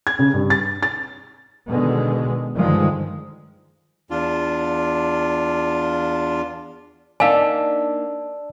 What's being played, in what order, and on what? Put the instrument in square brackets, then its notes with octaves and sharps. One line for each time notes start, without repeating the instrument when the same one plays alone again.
[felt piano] G#6
C#3
G2
A6
A6
[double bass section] B2 D3 D#3 G#3
G2 D3 D#3 F3 G#3
[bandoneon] E2 D4 F4
[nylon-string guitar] A#3 D4 D#4 [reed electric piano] D5 A5 E6 [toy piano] F5 G#5